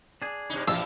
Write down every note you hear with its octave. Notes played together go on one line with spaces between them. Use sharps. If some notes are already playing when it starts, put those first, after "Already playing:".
D4 G#4
G2 C3 D#4
A#1 B2 E3 G3 F5 A5 E6